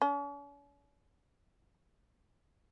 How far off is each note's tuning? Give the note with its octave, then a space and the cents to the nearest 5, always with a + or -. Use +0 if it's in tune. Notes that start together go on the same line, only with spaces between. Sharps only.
C#4 +45